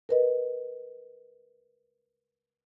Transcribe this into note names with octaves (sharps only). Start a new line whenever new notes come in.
A#4 B4 D#5